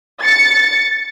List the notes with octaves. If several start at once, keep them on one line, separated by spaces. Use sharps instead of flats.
A6 C#7